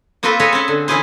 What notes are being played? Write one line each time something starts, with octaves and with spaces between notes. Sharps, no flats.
A#3 C4 F4 A4 B4 C5
G#4 A4 B4 C#5 D#5 E5
C4 C#4
D3
E3 C#4 E4 G#4 C5